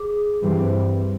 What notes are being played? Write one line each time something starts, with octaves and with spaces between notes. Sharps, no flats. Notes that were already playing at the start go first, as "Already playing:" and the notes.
Already playing: G#4
G2 E3 G3 C4